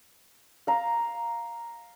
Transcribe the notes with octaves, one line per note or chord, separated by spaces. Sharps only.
F5 A#5